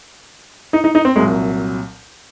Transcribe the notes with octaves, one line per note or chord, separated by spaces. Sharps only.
D#4
D#4
D#4
C4
C2 A#2 F#3 G#3